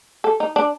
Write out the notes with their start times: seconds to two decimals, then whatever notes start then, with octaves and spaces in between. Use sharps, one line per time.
0.24 A4
0.40 D#4
0.56 D4